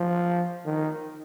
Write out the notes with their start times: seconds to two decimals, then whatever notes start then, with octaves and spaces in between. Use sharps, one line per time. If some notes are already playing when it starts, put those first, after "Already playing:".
Already playing: F3
0.66 D#3